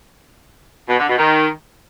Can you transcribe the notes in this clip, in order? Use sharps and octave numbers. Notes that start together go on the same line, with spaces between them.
B2
D3
B2
D#3